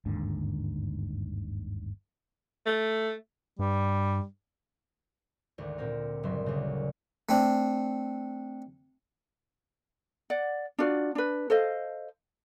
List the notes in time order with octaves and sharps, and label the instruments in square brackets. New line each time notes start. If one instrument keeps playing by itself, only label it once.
[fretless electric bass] G1 D#2 G#2 D3
[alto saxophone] A3
[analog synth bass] G2 [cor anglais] G3
[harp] G#1 D2
A#2 C4 A#4
F#1 G2 F#3 E5 C6
D2 C#3
[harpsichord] A3 C4 D4
[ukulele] D5 F#5
D4 F4 F#4 D5
D4 B4
A4 C5 D#5 F5